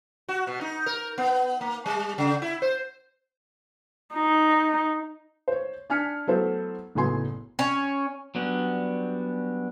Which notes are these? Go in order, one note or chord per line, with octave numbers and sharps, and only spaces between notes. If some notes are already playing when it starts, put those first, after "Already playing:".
F#4
B2
D#4
A#4
B3
A#3
G3
C#3
E4
C5
D#4
C5 C#5
D4 G#5 F6 B6 C#7
F#3 A3 B3 E4 A4 C5
F#1 A2 F#3 B3 G#5 C6
C#4
F#3 G3 B3 C#4 D4